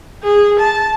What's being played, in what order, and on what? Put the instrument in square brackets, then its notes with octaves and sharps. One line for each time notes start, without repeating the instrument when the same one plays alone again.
[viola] G#4
A5